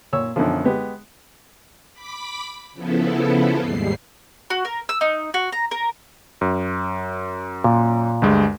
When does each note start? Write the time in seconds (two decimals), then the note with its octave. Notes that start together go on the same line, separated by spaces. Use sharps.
0.13 A#2 C#5 E6
0.36 F#2 B2 D3 D#3 F3
0.64 G#3 B3 G4
1.93 B5 D6 B6
2.73 C#3 F3 B3 E4 A4
3.59 D#2 G#2 G3 C7
4.50 F#4
4.65 A#4
4.89 E6
5.01 D#4
5.34 F#4
5.52 A#5
5.71 A#4
6.41 F#2
7.64 A#2
8.22 D2 G2 G#3